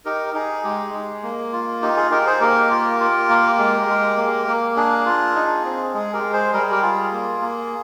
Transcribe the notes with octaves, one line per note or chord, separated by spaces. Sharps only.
D#4 G4 A#4
D#4 G#4
G#3 G4
G#3
A#3
F4
D#4 G4
G#4
D#4 G4 A#4
G#4 C5
A#3 G4 A#4
F4
F4
A#3
G#3
G#3
A#3
A#3
D4 G#4
F4
D#4
C4
G#3 G#4
G4 A#4
G#3
G#4 C5
G3 A#4
G#4
G4 A#4
F4 G#4
A#3
A#3